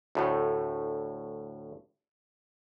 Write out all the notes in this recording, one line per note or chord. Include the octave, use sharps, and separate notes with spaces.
D2 A2 A3